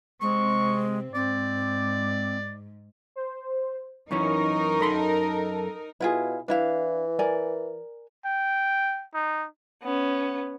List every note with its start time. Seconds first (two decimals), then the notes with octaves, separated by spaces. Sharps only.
0.21 C3 G#3 C4 C#6
1.15 G#2 C4 D5
3.16 C5
4.11 F#2 E3 C#4 D#4 A#4 C#6
4.81 F#2 A4 B5 C6
6.00 B2 E4 F4 G#4
6.48 E3 D4 E4 F5
7.19 A#4 D5 G#5
8.25 G5
9.14 D#4
9.83 B3 C#4